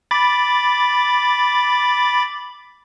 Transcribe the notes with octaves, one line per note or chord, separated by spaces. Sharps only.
B5 D6 A6